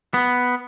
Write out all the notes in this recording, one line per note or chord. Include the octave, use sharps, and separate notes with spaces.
B3